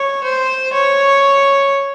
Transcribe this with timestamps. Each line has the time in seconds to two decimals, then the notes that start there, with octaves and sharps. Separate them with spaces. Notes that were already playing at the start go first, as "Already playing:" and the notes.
Already playing: C#5
0.24 C5
0.73 C#5